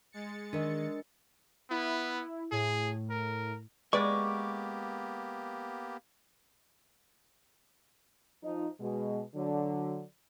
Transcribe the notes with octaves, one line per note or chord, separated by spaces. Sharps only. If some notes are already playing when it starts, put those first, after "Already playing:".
G#3 A6 C#7
D#3 D4 A#4 D#5
B3 E4
A2 G#4
A#4
G#3 A#3 B3 G4 B4 D5 C#6 D6
F3 D#4
B2 G#3
D3 F#3